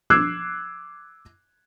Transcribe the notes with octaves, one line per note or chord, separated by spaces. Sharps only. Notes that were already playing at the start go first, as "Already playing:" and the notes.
D6 E6 F#6 G#6 C7